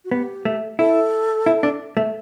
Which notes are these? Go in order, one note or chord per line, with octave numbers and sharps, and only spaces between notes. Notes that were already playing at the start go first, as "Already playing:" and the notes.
F#4
B3 G4
A3
E4 A4
E4
D4
A3